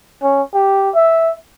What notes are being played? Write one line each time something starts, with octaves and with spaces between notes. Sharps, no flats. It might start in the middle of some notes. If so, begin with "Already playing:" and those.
C#4
G4
E5